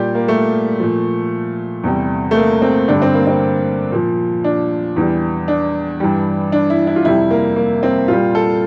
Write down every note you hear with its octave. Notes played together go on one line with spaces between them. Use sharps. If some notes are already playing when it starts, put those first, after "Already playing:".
Already playing: A#2 G3 G4 D5
A#3
A3
A#2 F3
E2 C3 G3
A3
A#3
C4
G2 D3 G3 D4
C4
A#3
C4
A#2 F3
D4
E2 E3 G3
D4
G2 E3 G3
D4
E4
E4
F4
F2 C3 G3 E4
A#3
A#3
C4
A#2 G3 F4
A4